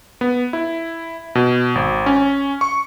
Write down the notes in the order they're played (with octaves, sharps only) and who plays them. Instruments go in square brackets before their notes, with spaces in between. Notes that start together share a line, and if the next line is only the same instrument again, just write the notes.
[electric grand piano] B3
E4
B2
G#1
C#4
C#6